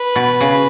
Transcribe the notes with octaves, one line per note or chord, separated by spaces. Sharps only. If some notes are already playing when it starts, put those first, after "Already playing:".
Already playing: B4
B2
C#3